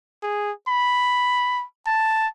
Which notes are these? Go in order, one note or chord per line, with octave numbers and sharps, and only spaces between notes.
G#4
B5
A5